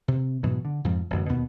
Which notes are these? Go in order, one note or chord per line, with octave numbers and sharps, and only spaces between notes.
C3
G#2 B2 E3 F#3
D3
F2 G#2 F3
A1 F#2 D3
D#2 B2 B3